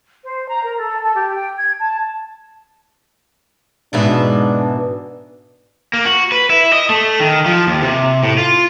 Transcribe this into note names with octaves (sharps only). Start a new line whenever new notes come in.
C5
A#5
A#4
A4
A4
G4
G5
G#6
A5
G#2 B2 E3 D4
A#3
F#4
B4
E4
D#5
A3
D#3
F3
D#2
C3
A2
F4